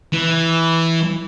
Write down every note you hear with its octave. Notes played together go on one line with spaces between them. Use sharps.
E3